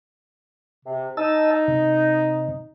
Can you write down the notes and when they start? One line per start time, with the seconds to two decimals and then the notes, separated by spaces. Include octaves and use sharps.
0.86 C3
1.17 D#4 D#5 A5 E6
1.68 C3